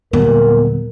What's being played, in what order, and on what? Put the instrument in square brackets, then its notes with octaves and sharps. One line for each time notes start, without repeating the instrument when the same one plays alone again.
[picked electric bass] D#2 D3 F#3 [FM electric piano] A#2 G3 [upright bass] B3 [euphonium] A#4